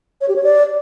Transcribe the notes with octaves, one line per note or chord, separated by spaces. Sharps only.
C#5
G4
C#5
D5